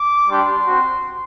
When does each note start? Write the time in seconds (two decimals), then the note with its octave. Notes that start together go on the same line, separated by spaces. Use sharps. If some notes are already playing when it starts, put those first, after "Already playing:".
Already playing: D6
0.28 G3 D4 G4 C6
0.66 C4 F#4